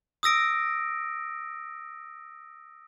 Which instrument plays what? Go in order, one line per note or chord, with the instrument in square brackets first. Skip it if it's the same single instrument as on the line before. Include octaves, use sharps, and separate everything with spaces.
[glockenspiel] D#6 E6 A#6 D7